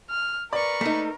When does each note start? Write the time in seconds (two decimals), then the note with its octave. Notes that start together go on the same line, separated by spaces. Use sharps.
0.10 F6
0.53 A#4 B4 D5 C#6
0.81 A3 A#3 D#4